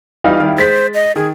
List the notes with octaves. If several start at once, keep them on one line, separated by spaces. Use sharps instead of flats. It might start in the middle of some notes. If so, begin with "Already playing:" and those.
E3 G3 D#4 F4 F5
D#3 G3 E4
G#3 C5 A6 B6
D#5
D#3 G#4